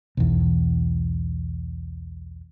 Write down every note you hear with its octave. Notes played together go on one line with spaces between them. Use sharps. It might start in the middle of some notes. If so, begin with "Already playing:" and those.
B1 E2